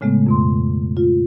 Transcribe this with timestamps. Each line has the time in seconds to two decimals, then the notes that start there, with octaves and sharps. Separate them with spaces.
0.01 A2 C#3 G#3 A3 B3
0.27 F2 B2 C6
0.97 F4